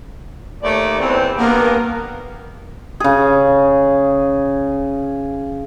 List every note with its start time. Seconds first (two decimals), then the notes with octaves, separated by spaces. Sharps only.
0.62 D#2 A3 D5
0.99 E2 C4
1.37 G2 A#3 B3 A#4
3.00 C#3 G#4